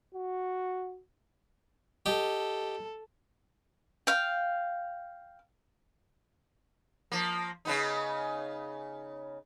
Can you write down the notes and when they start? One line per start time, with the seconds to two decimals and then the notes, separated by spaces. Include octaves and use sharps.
0.15 F#4
2.06 G4 A4 D#5
4.07 F5 G5
7.12 F3 A#3
7.65 C#3 B3 D#4